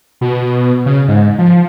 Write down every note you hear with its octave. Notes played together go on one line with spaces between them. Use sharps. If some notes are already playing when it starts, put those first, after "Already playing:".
B2
C#3
G#2
F3